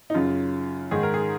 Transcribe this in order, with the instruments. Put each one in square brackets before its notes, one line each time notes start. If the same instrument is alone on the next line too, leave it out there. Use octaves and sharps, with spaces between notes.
[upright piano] D#4
F#2 C#3 F4
G#2 D#3 G#4
A#4
G#4